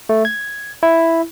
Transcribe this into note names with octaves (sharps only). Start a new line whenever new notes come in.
A3
G#6
E4